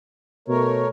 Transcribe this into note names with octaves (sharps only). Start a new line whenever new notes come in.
B2 A3 A#4 C#5